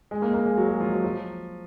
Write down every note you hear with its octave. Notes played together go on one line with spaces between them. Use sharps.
G#3
A#3
A#3
G#3
F#3
G#3
F3
F#3
F3